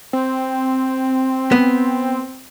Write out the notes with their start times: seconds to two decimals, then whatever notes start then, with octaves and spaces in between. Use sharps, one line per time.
0.13 C4
1.52 B3